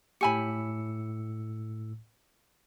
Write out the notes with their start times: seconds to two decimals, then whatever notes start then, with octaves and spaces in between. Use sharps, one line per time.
0.21 A2 G4 G#5 B5 E6 C#7